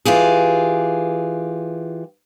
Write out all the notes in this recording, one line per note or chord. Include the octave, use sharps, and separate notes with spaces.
E3 F4 G4 G#4